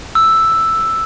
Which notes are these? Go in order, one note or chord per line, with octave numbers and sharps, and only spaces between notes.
E6